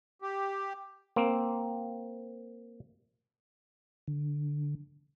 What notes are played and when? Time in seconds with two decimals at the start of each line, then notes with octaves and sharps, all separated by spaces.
0.22 G4
1.16 A#3 C4
4.08 D3